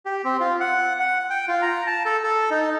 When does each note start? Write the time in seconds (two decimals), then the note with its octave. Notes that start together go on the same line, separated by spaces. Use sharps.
0.05 G4
0.25 C4
0.40 F4
0.60 F#5
1.00 F#5
1.30 G5
1.48 F4
1.62 A#5
1.87 A5
2.06 A4
2.23 A4
2.51 D#4